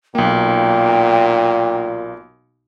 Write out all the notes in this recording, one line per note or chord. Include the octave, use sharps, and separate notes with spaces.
B1 A#2 A#3 G5